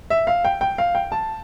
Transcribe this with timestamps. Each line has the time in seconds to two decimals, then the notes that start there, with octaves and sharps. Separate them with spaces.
0.10 E5
0.27 F5
0.45 G5
0.61 G5
0.78 F5
0.95 G5
1.12 A5